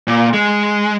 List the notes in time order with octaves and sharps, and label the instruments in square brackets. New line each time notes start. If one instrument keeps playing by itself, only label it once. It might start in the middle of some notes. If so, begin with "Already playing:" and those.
[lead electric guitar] A#2
G#3